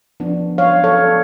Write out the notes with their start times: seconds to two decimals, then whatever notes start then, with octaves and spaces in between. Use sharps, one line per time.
0.20 F3 B3 D4
0.58 F#3 C#5 F5
0.84 A4 C#5
0.97 B3 D4